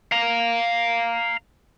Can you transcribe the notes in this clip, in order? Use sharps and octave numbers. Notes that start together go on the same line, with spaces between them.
F5 A#5